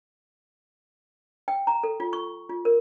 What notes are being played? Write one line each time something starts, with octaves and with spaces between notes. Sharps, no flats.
G5
A#5
A4
F4
C#6
F4
A#4